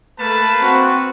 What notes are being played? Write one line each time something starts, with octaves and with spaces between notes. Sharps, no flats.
A3 A#3 B4 A5
C4 F#4